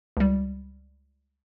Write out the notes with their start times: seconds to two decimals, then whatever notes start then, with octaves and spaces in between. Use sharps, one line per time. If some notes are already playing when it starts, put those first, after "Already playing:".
0.17 C#2 G3